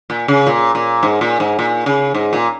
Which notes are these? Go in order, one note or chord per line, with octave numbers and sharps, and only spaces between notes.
A#2
C#3
A#2
A#2
G#2
A#2
G#2
A#2
C#3
G#2
A#2